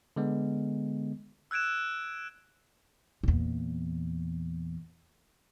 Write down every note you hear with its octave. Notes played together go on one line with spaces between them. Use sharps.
D3 G#3 B3
E6 F#6 G#6 D7 E7
E2 A#2